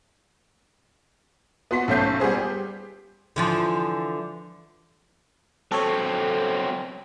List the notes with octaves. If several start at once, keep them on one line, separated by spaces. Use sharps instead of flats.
B3 F#4 C6 B6
B1 A3 C#4 G6 C7
G3 B3 G#4 C5
G4
D3 E3 F3
F#3 C4 A4 C#5